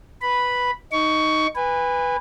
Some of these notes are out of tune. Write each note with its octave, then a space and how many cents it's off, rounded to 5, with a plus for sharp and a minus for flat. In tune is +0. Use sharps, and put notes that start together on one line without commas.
B4 +0 B5 -5
D#4 +0 C#6 +15
B4 +0 G#5 -30